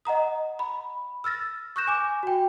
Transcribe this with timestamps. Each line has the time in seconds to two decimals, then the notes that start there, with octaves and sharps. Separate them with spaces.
0.05 D#5 F#5 A#5 D#6
0.59 B5
1.24 E6 F6 A6 A#6
1.76 C#6 D#6 F#6 G6 A#6 E7
1.87 G#5 D6
2.23 F#4 G5